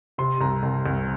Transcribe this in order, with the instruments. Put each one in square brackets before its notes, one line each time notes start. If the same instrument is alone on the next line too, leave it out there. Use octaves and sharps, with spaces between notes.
[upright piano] C3 C6
C2 A#5
C2
C2